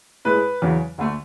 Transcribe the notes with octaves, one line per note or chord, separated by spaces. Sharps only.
A2 G#3 B4
E2 C#3 F#3
D2 D3 A3